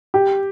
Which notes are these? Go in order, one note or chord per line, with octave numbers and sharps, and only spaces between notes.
G4